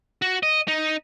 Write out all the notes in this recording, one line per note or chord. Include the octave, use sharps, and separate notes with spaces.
F#4
D#5
D#4